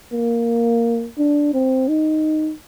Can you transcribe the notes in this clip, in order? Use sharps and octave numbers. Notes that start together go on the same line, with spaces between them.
A#3
D4
C4
D#4